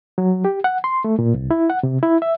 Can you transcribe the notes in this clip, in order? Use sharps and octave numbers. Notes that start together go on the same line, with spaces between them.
F#3
G4
F#5
C6
A3
A#2
C2
E4
F#5
C3
E4
E5